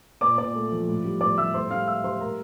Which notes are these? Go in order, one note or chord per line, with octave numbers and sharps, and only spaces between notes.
A#2 D5 D6
A#2 D5 D6
A3
F3
A2
G3
A2 D5 D6
G3 E5 E6
A2 C5 C6
G3 F5 F6
A2 E5 E6
G3 C5 C6
A2 A#4 A#5